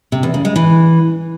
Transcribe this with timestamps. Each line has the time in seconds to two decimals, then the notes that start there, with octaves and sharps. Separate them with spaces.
0.12 C3
0.23 E2
0.34 C#3
0.45 G#3
0.56 E3